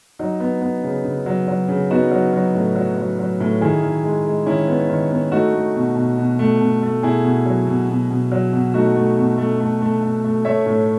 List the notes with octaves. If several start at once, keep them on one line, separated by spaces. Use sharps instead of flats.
F#3 D#4
B3
B3
C#3
C#3
F#3
F#3
C#3
B3 D#4 F#4
F#3
F#3
A2
F#3
F#3
F#3
A2
D#3 E4 G#4
D#3
G#3
G#3
D#3 C#4 E4
B3
D#3
B3
A3 D#4 F#4
A3
B2
B2
B2
A3
B2
A3
B2 E4 G#4
B2
F#3
B2
B2
B2
F#3
B2
A3 D#4 F#4
A3
B2
A3
A3
A3
A3
A3
A3 C#5 E5
A2